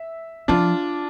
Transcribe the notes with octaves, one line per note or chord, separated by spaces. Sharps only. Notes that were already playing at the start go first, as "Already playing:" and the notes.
Already playing: E5
F3 D4 F4